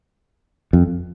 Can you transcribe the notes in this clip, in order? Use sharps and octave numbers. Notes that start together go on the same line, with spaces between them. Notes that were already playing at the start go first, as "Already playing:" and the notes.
F2